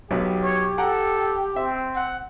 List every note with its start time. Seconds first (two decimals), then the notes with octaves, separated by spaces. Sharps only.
0.11 B1 F#3 B3 G4
0.42 C#5
0.78 A4 F#5 G5 A#5
1.56 C4 E5
1.95 F#5